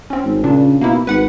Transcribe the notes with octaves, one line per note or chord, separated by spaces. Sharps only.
C4 C#4
G#1
A#2 C#3 D4
B2 A#3 D#4 E4
G#1 B4 F#5